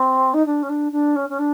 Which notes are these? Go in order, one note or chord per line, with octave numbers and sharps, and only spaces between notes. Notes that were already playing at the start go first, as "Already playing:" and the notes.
Already playing: C4
D#4
D4
C#4
D4
D4
C#4
C#4
D4